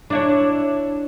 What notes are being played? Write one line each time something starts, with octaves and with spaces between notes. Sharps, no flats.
D4 E4 C#5